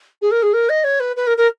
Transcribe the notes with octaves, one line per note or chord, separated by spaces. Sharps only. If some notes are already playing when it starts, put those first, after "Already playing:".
G#4
A#4
G#4
A#4
D#5
C#5
B4
B4
A#4
A#4